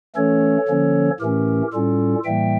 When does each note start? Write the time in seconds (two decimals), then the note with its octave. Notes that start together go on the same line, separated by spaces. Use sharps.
0.16 E3 A3 C#4 A4 C#5
0.68 D3 F3 A#3 C#4
1.20 A2 E3 A3 C#4 G4 A#4
1.72 A2 G3 C#4 F4 A4
2.25 A2 E3 G3 A#3 E5 G5